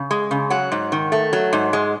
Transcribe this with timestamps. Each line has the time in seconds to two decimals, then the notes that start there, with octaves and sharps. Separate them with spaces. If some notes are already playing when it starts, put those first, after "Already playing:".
Already playing: C#3
0.11 G#3
0.31 C#3
0.50 F#3 F#5
0.72 G#2
0.92 D#3
1.12 A3
1.33 F#3
1.53 G#2
1.73 G#3